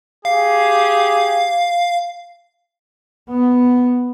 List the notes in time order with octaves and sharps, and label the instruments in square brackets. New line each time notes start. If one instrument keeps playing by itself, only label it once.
[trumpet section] G4 G#4 [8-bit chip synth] F5
[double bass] B3